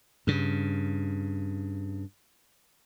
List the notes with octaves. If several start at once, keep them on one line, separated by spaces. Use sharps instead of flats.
G2 C#3